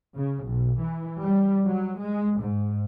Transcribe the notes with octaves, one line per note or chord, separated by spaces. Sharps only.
C#3
B1
E3
G3
F#3
G#3
G#2